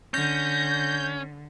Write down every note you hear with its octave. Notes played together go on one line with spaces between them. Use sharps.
D3 C#4 G6 A#6